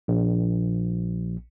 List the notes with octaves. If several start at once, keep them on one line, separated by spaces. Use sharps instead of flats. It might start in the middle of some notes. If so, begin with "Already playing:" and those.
A#1